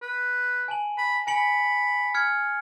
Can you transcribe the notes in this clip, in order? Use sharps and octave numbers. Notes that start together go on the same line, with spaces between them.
B4
G#5 A5 F#7
B5
G#5 B5 C#7 F#7
F6 G#6 C#7